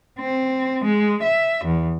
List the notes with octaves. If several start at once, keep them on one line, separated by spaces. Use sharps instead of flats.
C4
G#3
E5
E2